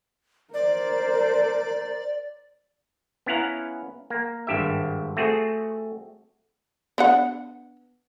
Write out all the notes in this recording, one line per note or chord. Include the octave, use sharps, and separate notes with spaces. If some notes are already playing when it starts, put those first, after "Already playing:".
A#4 C5 D5
B3 C#4 E4 F5 F#5 A#5
A#3
G#1 G2 G4 E5
A3 C4 F#4 G#4
B3 D4 F#5